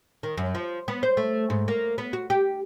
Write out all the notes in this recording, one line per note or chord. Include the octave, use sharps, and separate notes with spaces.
D#3
F#2
F3
B3
C5
A3
G#2
A#3
B3
F#4
G4